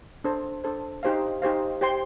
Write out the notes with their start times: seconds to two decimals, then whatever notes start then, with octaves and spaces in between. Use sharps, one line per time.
0.24 D4 A4 C5
0.64 D4 A4 C5
1.03 D#4 G4 C5 F5
1.42 D#4 G4 C5 F5
1.81 G4 C5 G5 C6